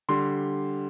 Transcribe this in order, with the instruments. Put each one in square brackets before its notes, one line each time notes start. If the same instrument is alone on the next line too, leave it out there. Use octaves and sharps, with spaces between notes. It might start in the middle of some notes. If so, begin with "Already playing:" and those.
[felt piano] D3 G3 C6